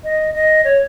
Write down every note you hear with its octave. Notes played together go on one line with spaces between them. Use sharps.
D#5
D#5
C#5